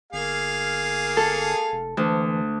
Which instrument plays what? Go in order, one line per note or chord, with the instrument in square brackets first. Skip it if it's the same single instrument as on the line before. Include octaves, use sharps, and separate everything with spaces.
[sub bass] G1 [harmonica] A#3 G#4 F5
[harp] A4
[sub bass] F1
[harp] D2 [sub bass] E3